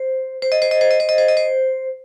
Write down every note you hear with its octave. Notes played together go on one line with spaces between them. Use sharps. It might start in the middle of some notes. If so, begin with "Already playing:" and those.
Already playing: C5
C5
D#5
C5
D#5
C5
D#5
C5
D#5
C5
D#5
C5